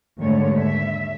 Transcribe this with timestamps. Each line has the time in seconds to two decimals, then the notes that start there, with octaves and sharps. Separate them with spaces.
0.19 D#2 G#2 D3 A3 C#5
0.57 E5